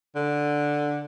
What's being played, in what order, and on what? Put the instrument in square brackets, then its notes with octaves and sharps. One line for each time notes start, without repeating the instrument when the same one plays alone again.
[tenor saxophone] D3